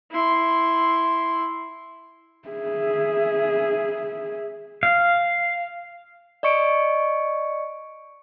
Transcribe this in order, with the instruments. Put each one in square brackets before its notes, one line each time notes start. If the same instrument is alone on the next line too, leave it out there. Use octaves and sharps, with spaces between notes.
[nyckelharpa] E4 C6
[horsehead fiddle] G#4 E5
[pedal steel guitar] F5
[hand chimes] D5 D#5 C#6 C#7 D7